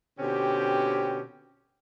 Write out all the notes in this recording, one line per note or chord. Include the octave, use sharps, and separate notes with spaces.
B2 D3 C4 C#4 G4